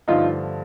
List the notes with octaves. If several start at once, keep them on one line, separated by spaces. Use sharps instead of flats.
G2 D3 F3 A3 D#4 F4